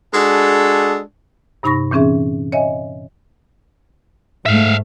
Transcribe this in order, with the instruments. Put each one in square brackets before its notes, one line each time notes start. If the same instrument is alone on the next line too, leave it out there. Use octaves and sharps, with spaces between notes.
[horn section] G#3 D4 F#4 G#4 A4
[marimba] G2 C3 D#4 B5 C#6 A#6
A#2 E3 C4 C#4 G#4 E5
C#5 D#5 E5 G#5
[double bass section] G#2 A3 [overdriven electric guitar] E5 F5